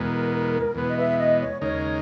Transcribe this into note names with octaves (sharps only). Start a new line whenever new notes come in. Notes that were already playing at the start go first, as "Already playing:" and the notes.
Already playing: E2 B2 G#3 B3 A#4
E2 B2 G#3 B3 B4
D#5
E5
D#5
C#5
D#2 C#3 G#3 D#4 A#4 C#5